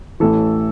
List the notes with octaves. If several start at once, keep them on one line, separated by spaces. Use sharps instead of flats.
A1 A2 E3 A4